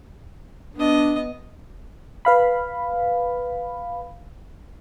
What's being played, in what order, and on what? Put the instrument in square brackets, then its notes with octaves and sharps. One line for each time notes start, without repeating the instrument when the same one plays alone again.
[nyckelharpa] B3 D#5 [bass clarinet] D4
[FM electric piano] B4 F5 B5